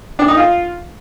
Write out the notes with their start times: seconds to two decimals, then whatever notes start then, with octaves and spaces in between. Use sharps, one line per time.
0.19 D4
0.28 D#4
0.37 F4